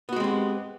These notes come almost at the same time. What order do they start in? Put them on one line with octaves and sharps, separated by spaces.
B3 F#4 G#3 C4 G4